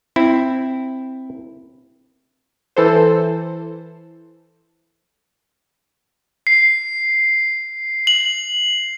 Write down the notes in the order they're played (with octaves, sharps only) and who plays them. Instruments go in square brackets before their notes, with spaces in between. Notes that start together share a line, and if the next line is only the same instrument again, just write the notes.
[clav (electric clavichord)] C4 E4
[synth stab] E3 A4 C5
[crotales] C7
F#7